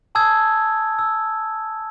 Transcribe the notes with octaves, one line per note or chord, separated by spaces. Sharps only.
G#5 A5 D#6 E6 G#6
E6